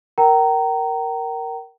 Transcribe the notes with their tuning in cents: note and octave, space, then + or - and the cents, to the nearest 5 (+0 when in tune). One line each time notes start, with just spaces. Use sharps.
A#4 +0 G5 -35 A#5 -10